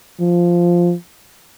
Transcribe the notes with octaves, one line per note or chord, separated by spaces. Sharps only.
F3